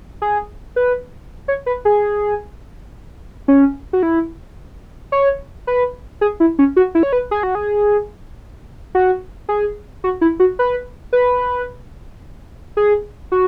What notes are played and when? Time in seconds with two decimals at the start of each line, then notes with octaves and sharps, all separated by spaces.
0.22 G#4
0.76 B4
1.48 C#5
1.66 B4
1.85 G#4
3.48 C#4
3.93 F#4
4.03 E4
5.12 C#5
5.67 B4
6.21 G#4
6.40 E4
6.59 C#4
6.76 F#4
6.95 E4
7.03 C#5
7.13 B4
7.31 G#4
7.43 F#4
7.55 G#4
8.95 F#4
9.49 G#4
10.04 F#4
10.21 E4
10.40 F#4
10.59 B4
11.13 B4
12.77 G#4
13.32 F#4